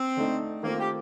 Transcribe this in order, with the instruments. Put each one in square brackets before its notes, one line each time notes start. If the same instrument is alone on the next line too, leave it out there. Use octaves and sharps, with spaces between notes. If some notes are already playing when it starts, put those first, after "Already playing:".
Already playing: [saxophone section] C4
[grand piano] D3 A3 D#4
[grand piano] D#3 A3 C4 F4 [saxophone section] A#3
[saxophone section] G4